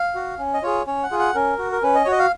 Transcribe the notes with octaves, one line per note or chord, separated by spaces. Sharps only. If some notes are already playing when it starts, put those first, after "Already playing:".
Already playing: F5
F#4
C#4
D#5
F4 G#4 C#5
C#4 C#5
F#5
F4 G#4
F#5
C#4 A#4
F#4
A#4
C#4 B4
D#5
C#5
F#4 D#5
F5